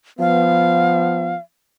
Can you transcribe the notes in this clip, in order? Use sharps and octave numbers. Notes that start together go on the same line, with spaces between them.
F3 B3 F5